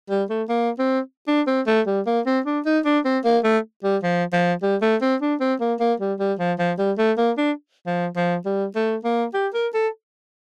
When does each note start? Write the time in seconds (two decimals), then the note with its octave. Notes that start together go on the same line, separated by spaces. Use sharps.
0.10 G3
0.30 A3
0.49 A#3
0.79 C4
1.27 D4
1.47 C4
1.67 A3
1.87 G3
2.06 A#3
2.26 C4
2.46 D4
2.65 D#4
2.85 D4
3.05 C4
3.24 A#3
3.44 A3
3.83 G3
4.03 F3
4.33 F3
4.62 G3
4.82 A3
5.02 C4
5.21 D4
5.40 C4
5.60 A#3
5.80 A#3
6.00 G3
6.19 G3
6.39 F3
6.59 F3
6.78 G3
6.98 A3
7.18 A#3
7.37 D4
7.86 F3
8.16 F3
8.45 G3
8.75 A3
9.04 A#3
9.34 G4
9.54 A#4
9.74 A4